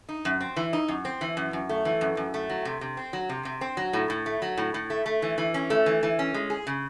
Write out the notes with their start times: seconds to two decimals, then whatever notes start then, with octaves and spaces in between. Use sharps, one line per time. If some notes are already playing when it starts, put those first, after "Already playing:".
0.09 D#4
0.25 F#2
0.41 C4
0.57 E3
0.73 D#4
0.88 F#2
1.05 C4
1.21 E3
1.37 F#2
1.53 F#2
1.69 A3
1.85 E3
2.01 F#2
2.17 F#2
2.34 A3
2.50 F#3
2.65 C3
2.81 C3
2.97 C4
3.13 F#3
3.29 C3
3.45 C3
3.61 C4
3.77 F#3
3.93 A2
4.10 A2
4.26 A3
4.42 F#3
4.57 A2
4.74 A2
4.90 A3
5.06 A3
5.22 E3
5.38 E3
5.54 C#4
5.70 A3
5.86 E3
6.03 E3
6.19 C#4
6.34 G#3
6.50 G#4
6.67 C#3